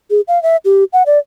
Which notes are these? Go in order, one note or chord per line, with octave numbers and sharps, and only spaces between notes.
G#4
F5
E5
G4
F#5
D5